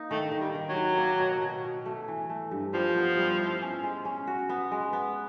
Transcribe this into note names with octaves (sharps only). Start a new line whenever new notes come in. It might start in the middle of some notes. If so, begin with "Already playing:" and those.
Already playing: A#3 D#4
D#3 A3
D#3
G3
D#3
F#3
D#3
A#3
B2
B2
B2
A3
E3
A3
G2
F3 G3
B3
G3
E4
C#4
G#3
C#4
F#4
B3
G#3
B3